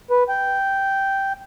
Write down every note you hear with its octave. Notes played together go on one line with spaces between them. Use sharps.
B4
G5